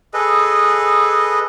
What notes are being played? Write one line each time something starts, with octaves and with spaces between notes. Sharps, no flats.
G#4 A4 B4 D#5